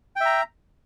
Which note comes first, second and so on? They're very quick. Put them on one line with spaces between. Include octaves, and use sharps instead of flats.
G5 E5 A#5